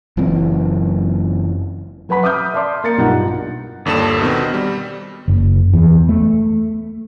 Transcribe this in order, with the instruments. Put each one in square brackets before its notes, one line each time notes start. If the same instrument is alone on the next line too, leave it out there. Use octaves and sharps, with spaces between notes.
[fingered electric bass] F#1 F#2 E3 C4
[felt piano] F#3 B4 F#5 B5 B6
E5 D6 D#6 F6 G6
D5 E5 A5 C6 D6
A#3 A6 C#7
B1 G2 D#4 F4 F#5
[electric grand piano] G1 D#2 D4 A4 E7
B2 D#3 B3 C4
G3
[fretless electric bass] F#1
E2
A3